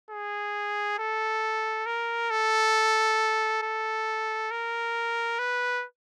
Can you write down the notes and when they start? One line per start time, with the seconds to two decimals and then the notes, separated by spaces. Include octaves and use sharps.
0.11 G#4
0.99 A4
1.86 A#4
2.31 A4
3.62 A4
4.51 A#4
5.39 B4